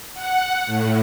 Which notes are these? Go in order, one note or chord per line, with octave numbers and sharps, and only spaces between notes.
F#5
A2